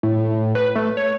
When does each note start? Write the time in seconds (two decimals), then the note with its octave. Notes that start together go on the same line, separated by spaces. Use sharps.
0.03 A2
0.55 B4
0.75 A3
0.97 C#5